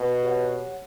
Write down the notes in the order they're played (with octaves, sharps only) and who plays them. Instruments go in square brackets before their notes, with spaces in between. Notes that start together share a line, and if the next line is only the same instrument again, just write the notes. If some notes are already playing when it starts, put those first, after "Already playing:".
Already playing: [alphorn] B2
[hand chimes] G4 C#5 F#5